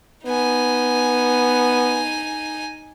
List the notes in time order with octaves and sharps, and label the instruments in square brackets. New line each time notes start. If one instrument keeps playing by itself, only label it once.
[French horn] B3 [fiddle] D#4 G#5